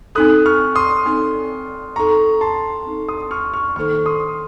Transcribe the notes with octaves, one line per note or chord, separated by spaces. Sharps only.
C4 D#4 A4 D#6 F#6
C#6 F6
C6 D#6
C4 D#4 A4
C4 D#4 A4 A#5 C#6
A5 C6
C4 D#4 A4
C6 D#6
C#6 F6
C#6 F6
D#3 A#3 D#4 A4 C5 C#6 F6
C6 D#6